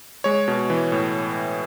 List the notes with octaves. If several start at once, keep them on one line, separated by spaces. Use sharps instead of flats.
G#3 C#5
B2
E3
A2